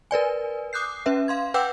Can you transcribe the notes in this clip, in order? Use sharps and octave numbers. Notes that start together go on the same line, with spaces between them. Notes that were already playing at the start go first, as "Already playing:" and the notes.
A#4 B4 D5 G#5
D6 D#6 F#6 G6 C7
C#4 B4 E5
F5 C6 G#6
B4 F#5 G5 D6 E6 G6